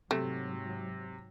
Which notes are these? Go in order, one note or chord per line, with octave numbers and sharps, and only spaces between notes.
G#2 C3 F#3 A3